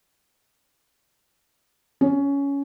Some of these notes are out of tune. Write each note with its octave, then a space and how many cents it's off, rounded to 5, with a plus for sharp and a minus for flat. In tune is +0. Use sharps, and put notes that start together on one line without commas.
C#4 +15